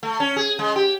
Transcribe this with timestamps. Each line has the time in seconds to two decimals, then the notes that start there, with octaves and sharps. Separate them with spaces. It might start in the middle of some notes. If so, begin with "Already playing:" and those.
0.03 A3
0.20 C#4
0.36 G#4
0.59 G#3
0.76 G4